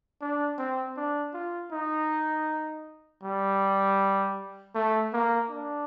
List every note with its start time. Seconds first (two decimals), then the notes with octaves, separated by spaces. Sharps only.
0.21 D4
0.58 C4
0.97 D4
1.34 F4
1.72 D#4
3.23 G3
4.75 A3
5.13 A#3
5.50 D4